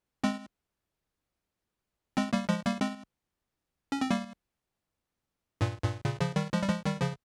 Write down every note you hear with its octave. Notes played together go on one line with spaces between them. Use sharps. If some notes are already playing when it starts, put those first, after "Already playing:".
G#3 C4
G#3 C4
G3 A#3
F3 G#3
G3 A#3
G#3 C4
C#4
C4
G3 A#3
G2 A#2
G2 A#2
A#2 C#3
C#3 F3
D#3 G3
F3 G#3
G3
F3 G#3
D#3 G3
C#3 F3